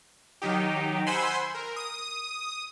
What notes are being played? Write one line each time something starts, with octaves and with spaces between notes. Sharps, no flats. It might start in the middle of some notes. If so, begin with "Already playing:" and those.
D#3 F#3 D#4 G4
C5 F#5 G#5 B5 C6 E6
A#4
D#6